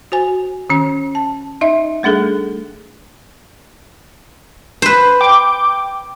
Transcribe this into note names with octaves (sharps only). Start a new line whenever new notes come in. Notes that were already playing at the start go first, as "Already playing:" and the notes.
F#4 C5 G#5
D#3 C#4
A5
D#4 D#5 E5
G3 A3 D4 G#4 A4
B4 C5
G5 D6